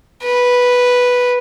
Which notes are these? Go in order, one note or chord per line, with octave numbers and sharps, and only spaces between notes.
B4